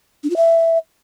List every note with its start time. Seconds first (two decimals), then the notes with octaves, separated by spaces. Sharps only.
0.23 D4
0.30 F4
0.36 E5